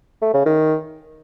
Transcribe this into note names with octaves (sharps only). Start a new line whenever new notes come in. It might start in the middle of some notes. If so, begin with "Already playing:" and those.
A3
C#3
D#3